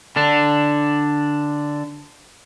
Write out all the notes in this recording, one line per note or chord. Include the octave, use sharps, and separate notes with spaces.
D3 D4